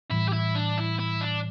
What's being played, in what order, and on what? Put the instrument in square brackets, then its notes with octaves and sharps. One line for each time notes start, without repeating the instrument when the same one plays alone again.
[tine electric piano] A2 E3 G3 [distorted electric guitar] E4
[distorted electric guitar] G4
E4
D4
E4
E4
D4